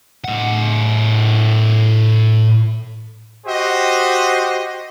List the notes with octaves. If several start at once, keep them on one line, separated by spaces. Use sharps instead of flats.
A2 F#5
F#4 G4 C5 D#5